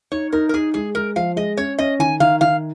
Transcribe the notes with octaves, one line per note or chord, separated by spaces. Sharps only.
D#4 C#5
D#4 A#4
A#4
D#4 G#4
G#3 G#4
G#3 A#4
F3 F5
G#3 D#5
C#4 C#5
C#4 D#5
D#3 G#5
D#3 F5
D#3 F5